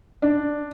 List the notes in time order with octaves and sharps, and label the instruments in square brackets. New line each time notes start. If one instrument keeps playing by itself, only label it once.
[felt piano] D4